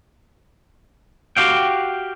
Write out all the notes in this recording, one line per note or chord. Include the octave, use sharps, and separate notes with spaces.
F#4 G4 F5 G5